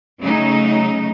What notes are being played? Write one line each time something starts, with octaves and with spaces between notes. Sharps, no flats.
C#3 F#3 A3 D#4